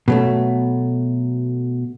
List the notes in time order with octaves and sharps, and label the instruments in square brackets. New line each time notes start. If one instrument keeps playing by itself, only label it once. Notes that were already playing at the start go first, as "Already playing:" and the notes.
[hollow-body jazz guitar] B2 F#3 A3